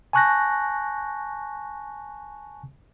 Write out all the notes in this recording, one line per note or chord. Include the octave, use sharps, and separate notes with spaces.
G#5 A5 C#6 F#6 G6 A#6